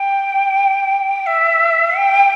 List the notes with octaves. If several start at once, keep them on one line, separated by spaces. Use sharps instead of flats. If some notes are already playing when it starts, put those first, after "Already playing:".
Already playing: G5
E5
G5